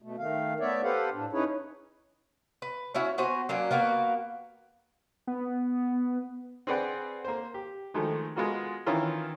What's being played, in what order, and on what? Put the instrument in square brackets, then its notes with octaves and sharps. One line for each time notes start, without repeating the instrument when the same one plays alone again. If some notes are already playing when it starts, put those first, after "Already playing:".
[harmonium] B2 A3
D#3 A3 F5
A3 B3 C#5 D5 E5
G4 A4 B4 C5 F5 F#5
A2 D4
C#4 D#4 E4 G#4 B4 C#5
[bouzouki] B4
C#4 E4 F#4 C#5
B3 F#4 C5 G#5
F#3 A#3 C#4 D4
A#3 B3 F#4 A#4
[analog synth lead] B3
[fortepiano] C4 G#4 B4 D5 F#5 G5
A#3 C5
G4
D#3 F3 G#3 A3
G#3 B3 F4 F#4 A#4
D#3 E3 C#4 E4 F4 A#4